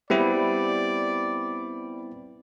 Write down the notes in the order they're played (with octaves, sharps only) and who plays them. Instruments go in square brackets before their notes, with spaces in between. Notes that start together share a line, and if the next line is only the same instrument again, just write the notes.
[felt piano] G3 [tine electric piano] B3 C4 E4 [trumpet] D5